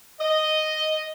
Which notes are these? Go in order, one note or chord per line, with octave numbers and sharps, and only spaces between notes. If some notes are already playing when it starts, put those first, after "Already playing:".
D#5